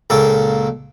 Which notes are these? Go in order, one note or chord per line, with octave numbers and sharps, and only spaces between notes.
C#2 A#2 A#3 A4